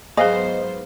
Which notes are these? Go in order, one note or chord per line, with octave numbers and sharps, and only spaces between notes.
G#2 F#3 B3 G#4 C5 D#5 F5 G#5